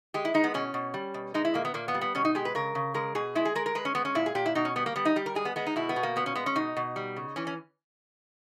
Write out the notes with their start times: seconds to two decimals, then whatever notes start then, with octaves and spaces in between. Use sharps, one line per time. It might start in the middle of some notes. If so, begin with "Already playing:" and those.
0.14 G#3 G4
0.25 E4
0.34 G#3 D#4
0.44 B3
0.54 B2 C#4
0.74 B2
0.94 G3
1.14 B2
1.34 G#3 D#4
1.45 E4
1.54 A#2 A#3
1.65 B3
1.74 A#2 A#3
1.88 B3
1.94 G3
2.01 B3
2.15 B2 C#4
2.25 D#4
2.35 G#3 G4
2.45 B4
2.55 C#3 A#4
2.75 C#3
2.94 G#3 A#4
3.15 B2 G#4
3.35 G#3 E4
3.45 G#4
3.55 G#3 A#4
3.66 A#4
3.75 G#3 B4
3.85 C#4
3.95 G#3 B3
4.05 C#4
4.15 A#2 E4
4.26 G#4
4.35 A#2 G4
4.46 E4
4.55 B2 D#4
4.65 C#4
4.76 G3 B3
4.86 A#3
4.96 G3 B3
5.05 D#4
5.16 G3 G4
5.26 A#4
5.35 G#3 G#4
5.45 B3
5.56 G#3 B3
5.66 D#4
5.76 B2 E4
5.89 B3
5.96 B2
6.03 A#3
6.16 A#2 B3
6.26 C#4
6.35 G#3 B3
6.46 C#4
6.55 B2 D#4
6.77 B2
6.96 G3
7.16 C#3
7.36 E3 C#4
7.47 C#4